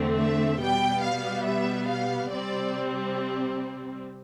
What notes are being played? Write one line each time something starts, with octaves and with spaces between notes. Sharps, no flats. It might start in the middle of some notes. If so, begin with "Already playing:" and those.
Already playing: E2 D3 A3 C4
E5
B2 G3 B3 G5
F5
E5
F5
C3 G3 C4 D5